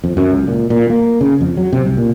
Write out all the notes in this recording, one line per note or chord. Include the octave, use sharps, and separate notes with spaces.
F2
F#2
C#2
A#2
A#2
A#3
C#3
F2
F#3
C3
C2
A#2